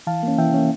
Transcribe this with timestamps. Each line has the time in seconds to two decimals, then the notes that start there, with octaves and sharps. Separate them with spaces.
0.07 E3 F5 A5
0.23 A#3 C#4
0.38 E3 E5 G5
0.54 A#3 C#4